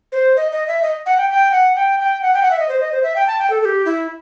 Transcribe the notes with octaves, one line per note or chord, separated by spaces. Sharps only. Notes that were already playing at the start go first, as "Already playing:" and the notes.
C5
D#5
D#5
E5
D#5
F#5
G5
G5
F#5
G5
G5
F#5
G5
F#5
E5
D#5
C5
D#5
C5
E5
G5
A5
G5
A4
A4
G4
E4